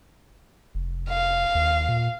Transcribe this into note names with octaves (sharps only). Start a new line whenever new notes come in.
F1
F5
D#2
A#2